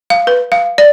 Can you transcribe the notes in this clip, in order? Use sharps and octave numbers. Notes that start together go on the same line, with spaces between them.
F5
B4
F5
D5